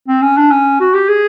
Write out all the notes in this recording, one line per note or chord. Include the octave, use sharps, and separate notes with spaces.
C4
C#4
D4
C#4
F#4
G4
G#4